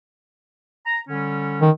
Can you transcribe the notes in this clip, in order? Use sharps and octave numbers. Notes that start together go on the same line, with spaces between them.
A#5
D3 G3 C#4
D#3